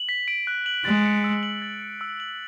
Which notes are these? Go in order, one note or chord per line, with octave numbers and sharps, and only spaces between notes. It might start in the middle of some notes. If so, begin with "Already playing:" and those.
Already playing: F#7
B6
D7
F#6
F#7
G#3 A6
C#7
E6
F#7
A6
C#7
E6
F#7